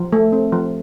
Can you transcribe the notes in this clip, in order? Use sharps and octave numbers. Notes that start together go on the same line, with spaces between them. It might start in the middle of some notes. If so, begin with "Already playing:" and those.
Already playing: F3
A3
C4
F3